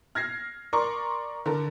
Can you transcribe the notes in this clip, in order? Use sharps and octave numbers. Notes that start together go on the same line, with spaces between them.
F6 G#6 A#6 C7
A#4 D5 A#5 C6 C#6
D3 A4 A#4